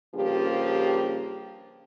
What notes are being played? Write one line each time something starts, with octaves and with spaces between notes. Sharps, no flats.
G2 C#3 F3 A#3 G4